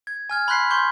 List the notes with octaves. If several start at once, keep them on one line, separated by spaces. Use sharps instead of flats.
G#6
G#5 F6 G#6
B5 C6 F#6 B6 C7
C6 C#6 G6